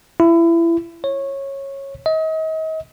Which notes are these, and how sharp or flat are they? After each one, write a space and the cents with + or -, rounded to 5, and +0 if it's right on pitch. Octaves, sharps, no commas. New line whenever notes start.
E4 +25
C#5 -15
D#5 +35